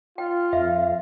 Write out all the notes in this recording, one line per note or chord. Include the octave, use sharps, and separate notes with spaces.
F4 G5
F2 E5 F5